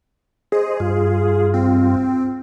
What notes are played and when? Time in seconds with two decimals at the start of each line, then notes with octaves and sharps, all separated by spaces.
0.52 G#4 C5 D#5
0.80 G2 F4
1.54 C4